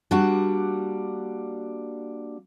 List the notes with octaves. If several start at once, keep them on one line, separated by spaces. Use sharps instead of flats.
G3 A#3 D4 F#4 F#5